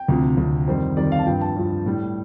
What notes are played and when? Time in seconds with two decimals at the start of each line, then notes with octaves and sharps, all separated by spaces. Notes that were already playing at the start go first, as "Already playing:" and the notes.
Already playing: G5
0.08 D2 C3 F3
0.37 D2 C3 F3
0.67 F2 D#3 G3 C5
0.97 F2 D#3 G3 D5
1.12 F5
1.19 A5
1.27 G2 F3 G5
1.41 A5
1.56 G2 F3
1.86 A2 G3